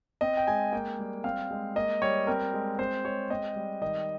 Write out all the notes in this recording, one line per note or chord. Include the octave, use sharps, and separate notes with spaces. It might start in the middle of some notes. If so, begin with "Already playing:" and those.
C4 D#5
G5
G#3 G#5
A#3 G5
G3
C4 F5
G#3
A#3 D#5
G3 C#5
C4 A#4
G#3
C4 C5
G#3 C#5
C4 D#5
G3
D#3 D#5